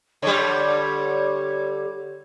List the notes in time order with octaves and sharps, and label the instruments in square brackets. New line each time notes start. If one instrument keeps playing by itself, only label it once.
[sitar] D3 G3 [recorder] C#5